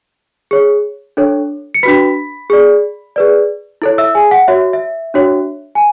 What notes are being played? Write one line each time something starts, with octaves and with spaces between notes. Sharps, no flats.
G#4 C#5
D4 A4 C#5
C#7
D4 F#4 B4 B5 B6
G#4 D5
G#4 B4 D5
E4 A4 C#5
E5 E6
G#4 G#5
F#5
F#4 C#5 E5
E5
D4 F#4 C#5
G#5